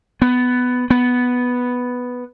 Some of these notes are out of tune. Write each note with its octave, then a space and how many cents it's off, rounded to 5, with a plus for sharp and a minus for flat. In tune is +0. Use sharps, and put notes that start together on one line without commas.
B3 +10
B3 +0